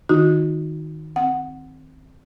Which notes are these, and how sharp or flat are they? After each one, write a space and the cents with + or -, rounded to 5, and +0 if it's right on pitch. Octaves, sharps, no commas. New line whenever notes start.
D#3 +0 D#4 +0 F#4 -25
C4 +0 F#5 +0